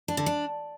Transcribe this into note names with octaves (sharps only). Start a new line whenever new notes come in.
D4
D3
D4